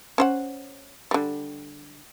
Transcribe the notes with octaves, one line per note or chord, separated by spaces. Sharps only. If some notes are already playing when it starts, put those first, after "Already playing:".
C#4 C5 F#5
D3 G3